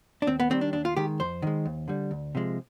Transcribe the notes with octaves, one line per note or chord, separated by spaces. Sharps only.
D4
D#2 C4
B3
D#3 G3 C4
D4
D#2 D4
F4
D#3 G#3 G4
F2 C5
D#3 G#3
D#2
D3 G3
D2
C3 F3 G#3